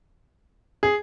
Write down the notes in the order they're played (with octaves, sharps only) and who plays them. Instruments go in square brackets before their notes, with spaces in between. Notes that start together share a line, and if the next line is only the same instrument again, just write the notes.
[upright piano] G#4